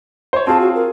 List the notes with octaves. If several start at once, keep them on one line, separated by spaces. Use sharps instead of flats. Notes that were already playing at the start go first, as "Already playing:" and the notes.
C5 C#5
C4 F4 G#4 A5
F#4
A#4